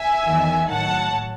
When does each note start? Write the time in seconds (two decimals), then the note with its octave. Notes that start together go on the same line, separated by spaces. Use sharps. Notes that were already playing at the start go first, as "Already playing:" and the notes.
Already playing: E5 G#5
0.24 E2 D#3 F#3
0.69 A2 F#3 F#5 A5